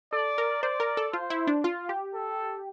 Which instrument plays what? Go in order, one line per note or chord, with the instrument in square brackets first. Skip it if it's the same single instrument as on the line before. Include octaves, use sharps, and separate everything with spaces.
[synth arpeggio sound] A4 [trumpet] D5
[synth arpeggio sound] A#4
[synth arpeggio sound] C5 [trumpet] D5
[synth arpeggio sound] A#4
A4
[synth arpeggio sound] F4 [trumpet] C5
[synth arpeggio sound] E4
D4
F4
G4
[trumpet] A4